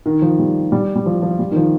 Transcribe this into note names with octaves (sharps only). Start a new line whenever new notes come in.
D#3
F3
G3
G3
G3
F3
F3
G3
D#3
F3